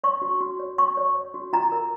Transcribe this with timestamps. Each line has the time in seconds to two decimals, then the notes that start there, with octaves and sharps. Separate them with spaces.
0.04 C#5 C#6
0.22 F#4
0.40 F#4
0.59 C#5
0.78 C#5 C#6
0.97 C#5
1.15 C#5
1.34 F#4
1.53 F4 A#5
1.72 A#4